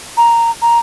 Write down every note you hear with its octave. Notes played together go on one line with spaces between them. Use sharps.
A#5
A#5